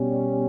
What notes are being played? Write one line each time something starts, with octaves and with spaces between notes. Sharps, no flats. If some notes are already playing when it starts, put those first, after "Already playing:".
Already playing: B2 G3 C#4